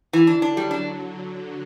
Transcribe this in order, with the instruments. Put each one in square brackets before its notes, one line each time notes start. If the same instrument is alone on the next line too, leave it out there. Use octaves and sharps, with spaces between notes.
[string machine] D3 [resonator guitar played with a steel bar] E3
[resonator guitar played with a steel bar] D4
[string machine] F#3 [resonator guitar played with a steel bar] D4
[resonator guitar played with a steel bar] G3
D4